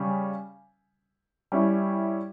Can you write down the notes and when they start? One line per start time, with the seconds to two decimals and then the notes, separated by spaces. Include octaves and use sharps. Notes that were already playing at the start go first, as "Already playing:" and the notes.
Already playing: C#3 G3 C#4
1.52 G3 C#4 E4